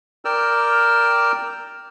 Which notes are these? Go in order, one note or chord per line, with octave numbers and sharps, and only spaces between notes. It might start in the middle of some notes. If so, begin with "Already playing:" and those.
A#4 D5 G5 E6 F6